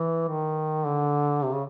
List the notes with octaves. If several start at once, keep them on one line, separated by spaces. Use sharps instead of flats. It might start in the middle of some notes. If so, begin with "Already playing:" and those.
Already playing: E3
D#3
D3
C3
C#3